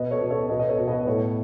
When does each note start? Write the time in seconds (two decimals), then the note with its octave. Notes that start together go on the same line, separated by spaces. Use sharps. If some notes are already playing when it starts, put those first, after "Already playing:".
Already playing: B2 B4 D#5
0.11 A4 C#5
0.21 B2
0.30 A4 C#5
0.49 B2 B4 D#5
0.59 D#5
0.69 A4 C#5
0.79 B2
0.87 B4 D#5
1.07 A2 A4 C#5